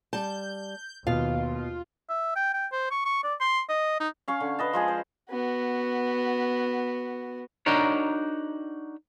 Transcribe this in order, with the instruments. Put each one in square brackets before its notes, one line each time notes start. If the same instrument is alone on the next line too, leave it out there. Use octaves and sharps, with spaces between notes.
[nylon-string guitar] G3 A5 [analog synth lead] G6
[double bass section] D#2 [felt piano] B2 [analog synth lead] F4 [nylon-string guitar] F5
[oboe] E5
G5
G5
C5
C#6
C#6
D5
C6
D#5
D#4
[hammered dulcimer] C#4 F5 C#6
D3
B4 D#5 A5
F3 G#3 G#4
C5
[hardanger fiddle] B3 F#4
[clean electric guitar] D4 D#4 F#4 A#4 C#5